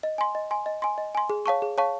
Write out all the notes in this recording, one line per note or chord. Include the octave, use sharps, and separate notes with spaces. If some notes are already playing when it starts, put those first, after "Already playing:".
D#5
G#5 C6
D#5
G#5 C6
D#5
G#5 C6
D#5
G#5 C6
G#4
C#5 F5 A5 C#6
G#4
C#5 F5 A5 C#6